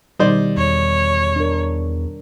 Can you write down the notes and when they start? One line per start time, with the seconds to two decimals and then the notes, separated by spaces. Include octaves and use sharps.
0.20 B2 D#3 G3 D#4 C5 D5
0.57 E2 C#5
1.36 D4 A#4